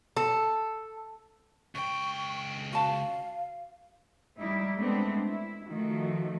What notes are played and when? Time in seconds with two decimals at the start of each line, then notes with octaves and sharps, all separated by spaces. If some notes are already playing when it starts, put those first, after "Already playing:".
0.17 A4
1.75 C#2 G5 C#6
2.73 F#4 F5 A5
4.39 G3 D#4 E4
4.79 G#3 A3 B3 C4 D4
5.27 E4
5.68 D#3 F3 A3 F#4